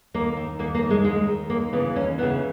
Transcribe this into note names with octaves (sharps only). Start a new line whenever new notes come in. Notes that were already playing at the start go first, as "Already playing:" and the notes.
D#2 A#3
D#3
D#2 A#3
A#3
D#3
G#3
D#2 G#3
D#3
D#2 A#3
C#3 E3 B3
D#2 C#4
C#3 E3 B3